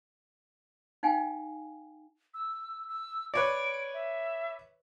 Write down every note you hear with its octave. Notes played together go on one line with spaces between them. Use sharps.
D#4 F5 G5 G#5
E6
E6
B4 C#5 D5 D7
E5